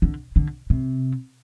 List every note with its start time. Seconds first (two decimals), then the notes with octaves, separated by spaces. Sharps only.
0.02 D3
0.36 D3
0.70 C3